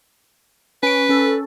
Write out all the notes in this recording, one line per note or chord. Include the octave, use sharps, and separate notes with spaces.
C#4 B4 D7
C#4 A4